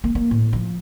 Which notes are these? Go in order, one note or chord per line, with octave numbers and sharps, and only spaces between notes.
A#3
A#3
A2
F3